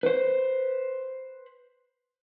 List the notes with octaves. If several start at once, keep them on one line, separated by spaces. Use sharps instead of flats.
B4 C5